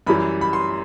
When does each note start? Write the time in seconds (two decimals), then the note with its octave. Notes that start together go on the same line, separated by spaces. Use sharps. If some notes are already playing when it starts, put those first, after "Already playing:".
0.07 F#2 E3 G3 B5
0.41 B5
0.53 C6